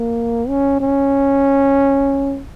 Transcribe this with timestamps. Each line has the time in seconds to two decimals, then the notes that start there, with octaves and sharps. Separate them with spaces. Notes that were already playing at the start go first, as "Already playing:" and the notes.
Already playing: A#3
0.48 C#4
0.80 C#4